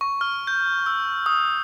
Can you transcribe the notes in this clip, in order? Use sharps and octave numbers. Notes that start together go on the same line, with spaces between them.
C#6
F6
G6
E6
D#6